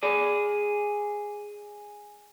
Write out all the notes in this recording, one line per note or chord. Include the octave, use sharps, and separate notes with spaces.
G#4 D5